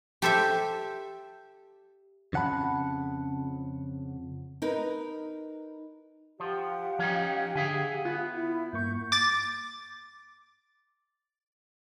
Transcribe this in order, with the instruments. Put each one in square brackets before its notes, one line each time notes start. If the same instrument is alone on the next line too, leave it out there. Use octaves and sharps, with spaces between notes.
[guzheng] G4 A4 C5 E5
[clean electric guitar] F2 C#3 F#5 A5 B5
[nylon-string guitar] D#4 A#4 B4
[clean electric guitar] F3 [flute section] G4 F5 F#5
[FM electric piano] F3 [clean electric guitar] C#4 D#4
[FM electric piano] D3 [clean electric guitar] G#4 E5 G#5
[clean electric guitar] B3 [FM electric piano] F4
[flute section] E4
[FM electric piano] G2 A#3 C#6 [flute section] G6
[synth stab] D6 A6